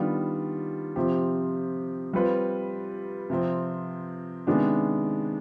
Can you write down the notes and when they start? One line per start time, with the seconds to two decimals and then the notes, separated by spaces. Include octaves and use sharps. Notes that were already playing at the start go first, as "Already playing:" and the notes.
Already playing: D#3 G3 B3 D4 F4
0.96 C3 F3 C4 G4 C5
2.13 G3 C4 F4 B4
3.30 C3 F3 C4
4.47 C3 D#3 G#3 B3 D4